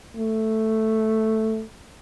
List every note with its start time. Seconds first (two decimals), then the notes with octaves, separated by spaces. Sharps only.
0.17 A3